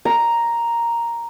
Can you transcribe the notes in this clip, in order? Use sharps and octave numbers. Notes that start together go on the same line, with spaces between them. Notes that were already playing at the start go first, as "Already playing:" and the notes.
A#5